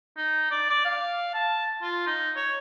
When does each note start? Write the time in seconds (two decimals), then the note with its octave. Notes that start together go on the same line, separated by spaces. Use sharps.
0.17 D#4
0.51 D5
0.69 D5
0.85 F5
1.34 A5
1.82 F4
2.07 D#4
2.36 C#5